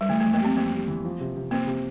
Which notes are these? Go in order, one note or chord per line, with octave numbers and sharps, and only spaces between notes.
G3
E3 A3
F2 A3
A#3
G3 C4
F2 A#3
G3
E3
F3
C3
C3
A#3 C4
C3